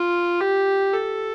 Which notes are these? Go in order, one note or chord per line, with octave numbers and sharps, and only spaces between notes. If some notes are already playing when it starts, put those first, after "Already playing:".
Already playing: F4
G4
A4